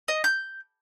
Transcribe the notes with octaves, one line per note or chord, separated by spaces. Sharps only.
D#5
G6